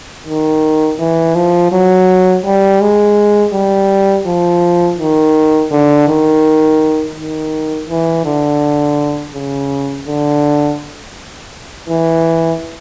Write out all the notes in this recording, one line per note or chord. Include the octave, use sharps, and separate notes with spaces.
D#3
E3
F3
F#3
G3
G#3
G3
F3
D#3
D3
D#3
D#3
E3
D3
C#3
D3
E3